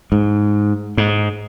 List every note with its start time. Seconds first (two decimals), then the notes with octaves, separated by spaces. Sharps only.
0.12 G#2
0.97 G#2